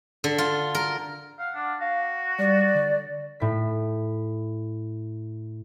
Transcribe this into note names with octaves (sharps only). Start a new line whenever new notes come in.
D3
F4
A#4
F5 F#5
D4
F#4 F5
G3 D5
D3
A2 B6